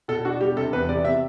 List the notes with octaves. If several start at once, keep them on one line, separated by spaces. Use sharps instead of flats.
B2 A4
D4 F#4
G3 G4
C3 A4
E2 B4
C3 D5
C3 E5